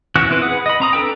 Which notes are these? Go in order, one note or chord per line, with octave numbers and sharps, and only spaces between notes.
E3 C#4 F#4 F#6
E3 C4 E4 B4
G#4 B4 F#5 D#6
D#5 B5
C4 A#5 D#6
D4 A4 B4 G5